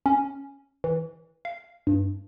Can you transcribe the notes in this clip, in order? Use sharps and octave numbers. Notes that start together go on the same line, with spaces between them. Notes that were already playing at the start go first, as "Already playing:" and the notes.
C#4
E3
F5
G2